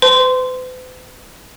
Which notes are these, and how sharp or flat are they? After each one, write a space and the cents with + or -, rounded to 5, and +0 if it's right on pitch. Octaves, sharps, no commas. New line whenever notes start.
B4 +45 C6 -15